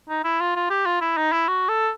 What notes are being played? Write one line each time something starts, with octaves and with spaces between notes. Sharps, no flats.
D#4
E4
F4
F4
G4
F4
E4
D#4
E4
F#4
A4